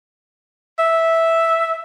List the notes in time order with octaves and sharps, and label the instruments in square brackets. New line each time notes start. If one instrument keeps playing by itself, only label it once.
[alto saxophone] E5